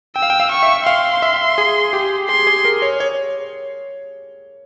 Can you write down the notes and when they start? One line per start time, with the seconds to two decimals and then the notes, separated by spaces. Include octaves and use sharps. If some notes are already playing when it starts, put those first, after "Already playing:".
0.16 G5 E6
0.22 F5
0.30 G5
0.40 F5
0.51 C#6
0.63 E5
0.87 F5 C6
1.22 E5
1.58 G#4
1.93 G4
2.29 G#4 C6
2.47 G#4
2.65 A#4
2.82 C#5
3.00 C#5